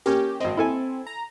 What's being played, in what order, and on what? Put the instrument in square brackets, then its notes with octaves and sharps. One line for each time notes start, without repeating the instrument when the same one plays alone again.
[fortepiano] A#3 C#4 [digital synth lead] G4
[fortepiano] G#1 D#5 [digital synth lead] C4
[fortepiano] E4 A4 G#5
[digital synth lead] A#5